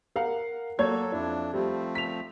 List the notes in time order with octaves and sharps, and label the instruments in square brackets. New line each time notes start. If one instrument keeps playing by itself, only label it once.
[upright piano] A#4 F5 F#5
[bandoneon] F#3 A4 [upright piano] A#3 C#5 G#6
[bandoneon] F2 D4 [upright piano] E4
[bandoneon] F3 A3 C4 [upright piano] G3
[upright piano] B6 F7